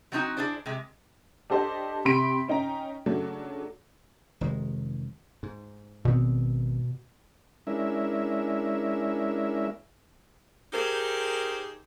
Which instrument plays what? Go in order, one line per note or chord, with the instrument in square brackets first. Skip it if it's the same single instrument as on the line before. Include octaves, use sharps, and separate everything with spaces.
[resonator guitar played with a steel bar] F#3 G3 C4 C#4 D#4 F#4
D4 E4 G#4 C5 D5
C3 G#3
[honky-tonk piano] D4 G4 A4 C5 D#5 A5
C3 G4 B5 C6 B6 D7
C#4 D#4 G5 A#5
C#3 F#3 A3 D4
[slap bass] F1 D#3 G#3
G#2
[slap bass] G#1 B3 C4 [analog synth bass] B2
[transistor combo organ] G#3 C#4 D4 E4 A#4 E5
[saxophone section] D#4 G4 G#4 A#4 C5